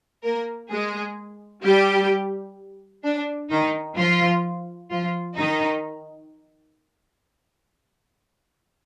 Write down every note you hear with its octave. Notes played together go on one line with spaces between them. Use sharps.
A#3 A#4
G#3 G#4
G3 G4
D4
D#3 D#4
F3 F4
F3 F4
D#3 D#4